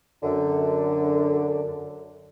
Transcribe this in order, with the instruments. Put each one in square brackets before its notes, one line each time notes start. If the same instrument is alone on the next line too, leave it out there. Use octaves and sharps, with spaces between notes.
[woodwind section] F#2 D3